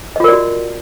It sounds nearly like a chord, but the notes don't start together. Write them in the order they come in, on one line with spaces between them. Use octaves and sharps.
D#5 F4 A#4 D5 F#4